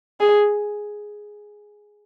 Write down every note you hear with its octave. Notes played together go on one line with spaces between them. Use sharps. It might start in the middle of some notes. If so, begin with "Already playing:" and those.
G#4